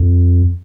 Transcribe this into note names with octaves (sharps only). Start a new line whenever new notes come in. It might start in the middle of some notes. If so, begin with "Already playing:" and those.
Already playing: F2